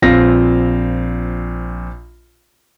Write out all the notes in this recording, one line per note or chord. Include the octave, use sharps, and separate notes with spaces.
A#1 C4 F4 F5 A#6